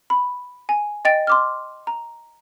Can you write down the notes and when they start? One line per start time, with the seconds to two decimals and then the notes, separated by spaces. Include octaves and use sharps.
0.10 B5
0.69 G#5
1.05 D#5 G5 A6 D7
1.27 C6 D6 F6
1.87 A#5